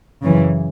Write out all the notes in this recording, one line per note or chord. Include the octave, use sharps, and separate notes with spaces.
F#2 C#3 E3